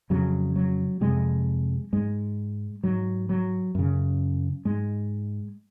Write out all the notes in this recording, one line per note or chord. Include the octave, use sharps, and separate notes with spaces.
F2 C#3 F#3
F#3
F2 C3 G#3
G#2 G#3
G#2 F#3
F#3
F#2 C#3
G#2 G#3